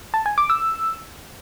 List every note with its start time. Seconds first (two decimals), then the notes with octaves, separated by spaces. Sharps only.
0.14 A5
0.26 G#5
0.38 D6
0.50 E6